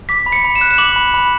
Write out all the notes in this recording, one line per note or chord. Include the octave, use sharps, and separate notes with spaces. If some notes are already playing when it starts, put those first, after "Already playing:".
D6 B6
B5
C#7
B5
E7
F#6
E7
D6 F#7
B5
B5